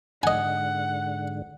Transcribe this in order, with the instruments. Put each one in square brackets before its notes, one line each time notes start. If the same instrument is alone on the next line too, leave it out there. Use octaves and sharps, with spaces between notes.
[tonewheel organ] G#2 D3 [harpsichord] D#5 G#5 [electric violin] F#5